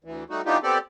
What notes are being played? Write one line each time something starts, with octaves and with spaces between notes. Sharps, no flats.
D2 E3
G3 A3 D#4 F#4
E3 B3 D4 D#4 F4 G4
B3 C4 G4 A4 D5